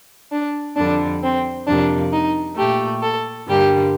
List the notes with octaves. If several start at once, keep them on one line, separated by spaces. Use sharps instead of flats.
D4
F2 D3 G3 D4
C4
F2 C3 G3 A#3 D4
D#4
A#2 A3 G4
A4
G2 D3 G3 A#3 G4